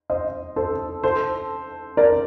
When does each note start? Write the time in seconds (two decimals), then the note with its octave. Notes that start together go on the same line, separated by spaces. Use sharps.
0.10 C5 D#5
0.56 A4 C5
1.03 A4 C5
1.97 A#4 D5